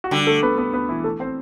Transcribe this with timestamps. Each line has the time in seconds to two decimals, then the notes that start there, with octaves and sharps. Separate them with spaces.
0.04 F#4
0.11 D3 G3 G4
0.27 A3 A4
0.43 B3 B4
0.58 B3 B4
0.73 B3 B4
0.89 E3 E4
1.04 A3 A4
1.20 C4 C5